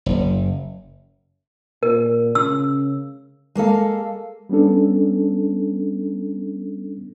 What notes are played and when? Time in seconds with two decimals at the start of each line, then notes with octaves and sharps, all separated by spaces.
0.06 F#1
1.83 A#2 A#4
2.35 C#3 E6
3.55 G#3 A#3 A4 F5
4.49 G3 B3 C#4 D4 A4